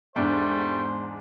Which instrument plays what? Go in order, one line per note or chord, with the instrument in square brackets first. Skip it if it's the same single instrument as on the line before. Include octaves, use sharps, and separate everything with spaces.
[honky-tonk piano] E2 G#2 [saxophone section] G3 A3 [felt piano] D4 [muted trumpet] C5